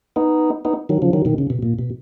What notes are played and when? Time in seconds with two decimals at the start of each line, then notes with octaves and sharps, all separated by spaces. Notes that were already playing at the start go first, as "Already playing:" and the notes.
0.16 B3 D#4
0.65 B3 D#4
0.89 D#3 F#3
1.02 C#3 F3
1.13 D#3 F#3
1.25 B2 D#3
1.38 C#3
1.50 B2
1.63 A#2
1.79 B2